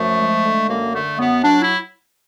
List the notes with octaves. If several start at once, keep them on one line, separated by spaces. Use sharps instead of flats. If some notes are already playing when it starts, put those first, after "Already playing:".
Already playing: F#2 F3 A3
G#3
D3
F#2 A#3
D3 A3
F#2 B3
F#3 D4
E4